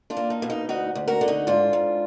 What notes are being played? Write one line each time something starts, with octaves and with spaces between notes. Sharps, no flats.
D4 F4
A#3
D#4
B2
D#4
D2 D#4 F#4
D2
F#4 A#4
D3
D#4 F#4
G#2 D4 F4
G#2